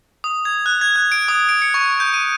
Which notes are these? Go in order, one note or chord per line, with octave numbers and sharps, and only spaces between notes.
D#6
G#6
F#6
G#6
F#6
D7
D#6
D7
C#7
C#6
G6
D#7